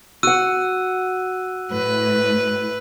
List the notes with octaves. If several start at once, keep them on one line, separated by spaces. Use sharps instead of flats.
F#4 F#5 E6 F#6 D#7
A2 B4